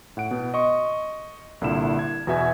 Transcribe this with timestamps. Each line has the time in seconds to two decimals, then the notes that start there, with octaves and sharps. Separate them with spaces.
0.17 A2 F#5 D7
0.31 B2 B3
0.54 D#5 C6 C#6 D#6
1.61 C2 A#2 D3 E4 E7
1.99 G#6
2.27 E2 B2 F#4 E5 G#5 G#6